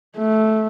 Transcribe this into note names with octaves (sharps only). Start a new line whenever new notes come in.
A3